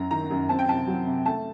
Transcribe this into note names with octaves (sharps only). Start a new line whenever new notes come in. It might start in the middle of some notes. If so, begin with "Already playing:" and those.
Already playing: F#2 F#3 A#5
D#3 A#5
F#2
C4 A5
G5
C3 A5
F#3
C3
A3 A5